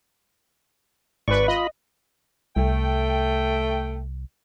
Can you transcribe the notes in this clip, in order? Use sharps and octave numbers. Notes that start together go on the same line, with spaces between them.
G#1 B4 D5 C#6
F4 D#5 B5
C2 A3 G5